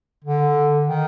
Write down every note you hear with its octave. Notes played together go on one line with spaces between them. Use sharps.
D3
D#3